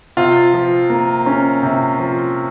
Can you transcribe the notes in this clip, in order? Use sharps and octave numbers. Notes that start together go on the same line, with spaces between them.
C3 F4
F3
A#3
C#4
C3
F3